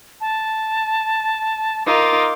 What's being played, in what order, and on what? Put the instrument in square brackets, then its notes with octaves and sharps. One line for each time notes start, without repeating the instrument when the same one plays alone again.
[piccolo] A5
[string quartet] D#4 F4 A#4 [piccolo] D6